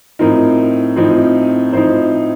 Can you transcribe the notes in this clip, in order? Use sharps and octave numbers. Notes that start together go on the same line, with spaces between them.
A2 F3 C4 D#4 A#4
A2 F3 C4 D#4
A2 F3 C4 D#4 C5